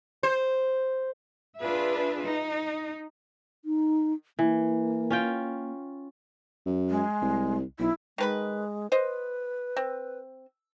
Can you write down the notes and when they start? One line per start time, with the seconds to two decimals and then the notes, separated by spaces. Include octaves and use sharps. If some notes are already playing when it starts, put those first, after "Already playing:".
0.23 C5
1.60 D4 F4 G#4 B4 E5
2.24 D#4
3.65 D#4
4.39 E3 A#3
5.10 C#4 F4 G5
6.66 F#2
6.90 G#3
7.22 C2
7.79 B1 E4
8.18 D#3 G#3 B4 B5
8.92 B4 C5 D#5
9.76 C4